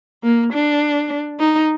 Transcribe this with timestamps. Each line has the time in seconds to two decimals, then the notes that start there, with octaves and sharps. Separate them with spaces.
0.23 A#3
0.53 D4
1.40 D#4